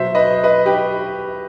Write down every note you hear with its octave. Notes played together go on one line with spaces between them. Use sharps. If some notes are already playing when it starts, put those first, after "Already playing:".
Already playing: B2 F#3 C5 E5
B4 D#5
B4 D#5
G4 B4